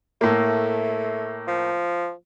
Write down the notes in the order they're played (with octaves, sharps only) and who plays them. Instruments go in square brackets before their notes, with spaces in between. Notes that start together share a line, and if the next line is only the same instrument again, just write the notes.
[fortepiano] A2 A#3 [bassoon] A3
[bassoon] F3